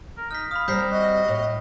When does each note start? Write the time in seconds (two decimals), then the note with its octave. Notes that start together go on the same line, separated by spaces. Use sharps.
0.17 A#4
0.31 D#4 F6 B6
0.51 F5 B5 D#6
0.68 G3 C4 A#4 G6 B6 C7
0.91 F#4 D#5
1.28 A2